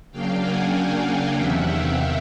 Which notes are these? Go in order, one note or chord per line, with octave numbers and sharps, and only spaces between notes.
C#3 F#3 A#3 D4 F5 G5
F#5 G#5
F5 G5
E2 C3 D#3 E5 F#5
F5 G5